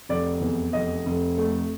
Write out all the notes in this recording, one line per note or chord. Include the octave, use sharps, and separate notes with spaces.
F1 D5
E2
F1 D#5
F1
A3